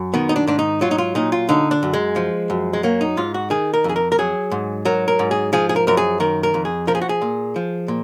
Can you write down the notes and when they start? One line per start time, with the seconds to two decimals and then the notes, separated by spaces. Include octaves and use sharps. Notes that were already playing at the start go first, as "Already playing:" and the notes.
Already playing: F#2
0.14 D#3 B3
0.29 D#4
0.36 D4
0.47 G#2 D4
0.59 D#4
0.81 F#3 F4
0.91 D#4
0.98 F4
1.15 A#2 D#4
1.32 F4
1.49 D3 D#4
1.71 D4
1.83 F#2
1.93 G#3
2.16 F3
2.50 F#2
2.73 G#3
2.83 F#3 A#3
3.01 D#4
3.17 G#2 F4
3.34 F#4
3.50 D#3 G#4
3.74 A#4
3.84 F2
3.89 G#4
3.96 A#4
4.12 A#4
4.19 F#3 G#4
4.51 G#2
4.85 F#3 A#4
5.08 A#4
5.19 G#2
5.31 G#4
5.53 F3 G#4
5.69 G#4
5.76 A#4
5.87 F#2 A#4
5.97 G#4
6.20 D#3 A#4
6.43 A#4
6.54 F2
6.65 G#4
6.87 F3 A#4
6.95 G#4
7.02 F#4
7.09 G#4
7.22 A#2
7.56 F3
7.88 A#2